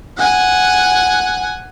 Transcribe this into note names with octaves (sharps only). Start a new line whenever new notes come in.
F#5 G#5